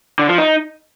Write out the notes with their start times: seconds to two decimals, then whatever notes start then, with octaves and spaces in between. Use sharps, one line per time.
0.19 D3
0.29 F3
0.38 D#4